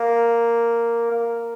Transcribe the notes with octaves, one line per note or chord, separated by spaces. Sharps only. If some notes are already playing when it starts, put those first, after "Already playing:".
Already playing: A#3
A#3